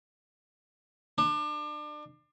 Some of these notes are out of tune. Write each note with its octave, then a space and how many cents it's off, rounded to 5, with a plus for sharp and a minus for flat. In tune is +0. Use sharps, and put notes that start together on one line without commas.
D4 +30